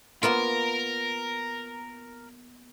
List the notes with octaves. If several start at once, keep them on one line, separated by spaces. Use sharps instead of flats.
A#3 B3 F4 A#4